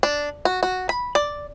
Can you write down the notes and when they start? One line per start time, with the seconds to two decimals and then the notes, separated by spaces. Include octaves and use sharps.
0.03 D4
0.45 F#4
0.63 F#4
0.89 B5
1.15 D5